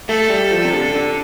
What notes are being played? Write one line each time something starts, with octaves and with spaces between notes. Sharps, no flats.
A3 A4
G3
F3
C3
D3
D3